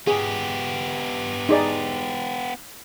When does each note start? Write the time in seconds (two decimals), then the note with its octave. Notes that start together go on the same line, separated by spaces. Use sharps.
0.07 B3 G4 G#4
1.49 D#4 G#4 D5